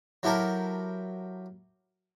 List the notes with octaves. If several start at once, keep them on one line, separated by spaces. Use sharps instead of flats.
F#3 E4 G4 A4 A#4